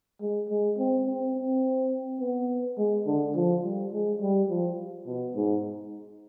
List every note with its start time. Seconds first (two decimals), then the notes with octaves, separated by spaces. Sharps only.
0.21 G#3
0.50 G#3
0.78 C4
1.06 C4
1.35 C4
2.20 B3
2.78 G#3
3.06 D3
3.35 F3
3.64 G3
3.93 G#3
4.21 G3
4.49 F3
5.07 B2
5.35 G#2